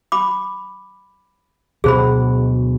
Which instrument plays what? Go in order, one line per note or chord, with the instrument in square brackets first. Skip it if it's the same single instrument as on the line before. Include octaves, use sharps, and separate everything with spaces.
[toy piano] B5 D6
[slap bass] D2 B2 F#3 [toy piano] G#4 C5 B5